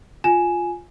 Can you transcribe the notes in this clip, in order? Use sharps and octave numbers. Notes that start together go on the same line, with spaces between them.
F4 G#5 E7